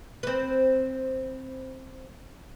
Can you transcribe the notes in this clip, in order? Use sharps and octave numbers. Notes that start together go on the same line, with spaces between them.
C4 B4